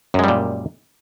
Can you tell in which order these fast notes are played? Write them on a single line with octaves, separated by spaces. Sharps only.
F#2 G#3 G3 A#2